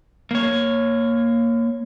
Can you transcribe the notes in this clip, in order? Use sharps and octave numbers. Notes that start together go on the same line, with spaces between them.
A#3 C#5